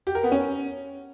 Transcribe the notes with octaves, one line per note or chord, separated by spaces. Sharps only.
G4
A#4
B3
C#4